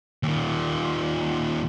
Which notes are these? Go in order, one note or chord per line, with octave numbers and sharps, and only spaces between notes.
D#2 A#2